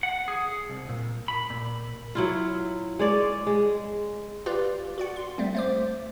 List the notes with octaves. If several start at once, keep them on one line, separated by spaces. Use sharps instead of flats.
F#5
G#4
C2
A#2
B5
A#2
F#3 E4 F4
G#3 C#5 D5
G#3
F4 G4 B4 D5 F5
F#4 D5 F#5
C6
G3 A3 C4
A3 C5 D6